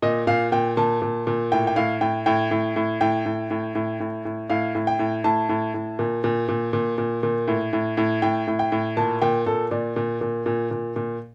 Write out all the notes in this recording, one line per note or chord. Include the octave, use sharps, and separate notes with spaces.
A#2 D#5
A#2 F5
A#2 G5
A#2 A5
A#2
A#2
A2 G5
G5
A2 F5
A2 G5
A2 G5
A2
A2
A2 G5
A2
A2
A2
A2
A2
A2 F5
A2
G5
A2
A2 A5
A2
A2
A#2
A#2
A#2
A#2
A#2
A#2
A2
A2
A2
A2 G5
A2
G5
A2
A#2 A5
A#2 G5
A#2 A4
A#2 D5
A#2
A#2
A#2
A#2
A#2